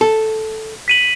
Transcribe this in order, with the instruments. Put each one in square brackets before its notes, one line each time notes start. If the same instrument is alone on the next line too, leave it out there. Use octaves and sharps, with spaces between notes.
[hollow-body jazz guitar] A4
[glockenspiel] B6 D#7 F#7